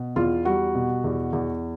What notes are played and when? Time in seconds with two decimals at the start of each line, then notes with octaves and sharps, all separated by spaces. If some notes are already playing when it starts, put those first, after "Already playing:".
Already playing: B2
0.16 E2 F4
0.45 G3 F#4
0.75 B2
1.04 E2
1.33 E2